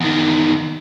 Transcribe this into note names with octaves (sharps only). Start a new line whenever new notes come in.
E2 D#3